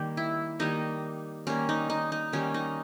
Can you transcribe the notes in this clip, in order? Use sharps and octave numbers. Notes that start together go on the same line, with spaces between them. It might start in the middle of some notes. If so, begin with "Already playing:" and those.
Already playing: D#3 G3 A#3 G4
E4
D#3 G3 A#3 D#4
D#3 G3 A#3 C#4
D#4
D#4
D#4
D#3 G3 A#3 C#4
D#4